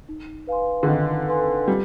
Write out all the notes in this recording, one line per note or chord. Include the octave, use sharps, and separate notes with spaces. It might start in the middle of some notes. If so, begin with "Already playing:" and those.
D#4
B4 F5 G#5 C6
D3
D#3 D#4
B4 F5 G#5 C6
G3 F4